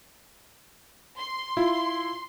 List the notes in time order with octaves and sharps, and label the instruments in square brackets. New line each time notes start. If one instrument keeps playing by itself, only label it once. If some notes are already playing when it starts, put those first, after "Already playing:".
[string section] C6
[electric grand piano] E4 [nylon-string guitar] F4